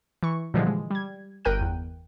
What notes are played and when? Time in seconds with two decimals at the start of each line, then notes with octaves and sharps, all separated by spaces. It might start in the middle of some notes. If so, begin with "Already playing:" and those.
0.23 E3 C#6
0.54 A#2 D3 E3 F3 G3 G#3
0.67 G#3
0.90 G3 G#6
1.45 G1 A#4 G5 F#6 D#7
1.61 E2